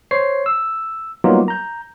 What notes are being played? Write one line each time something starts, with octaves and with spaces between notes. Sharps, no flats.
C5 C#5 C7
E6
F#3 G3 A#3 B3 D#4 F4
A#5 G6